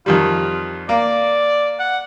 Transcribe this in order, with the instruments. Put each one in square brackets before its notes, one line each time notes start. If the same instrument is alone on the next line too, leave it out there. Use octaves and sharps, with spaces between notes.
[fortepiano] F2 D#3 G3 [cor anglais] F4
[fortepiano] A#3 [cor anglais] D5
[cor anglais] F#5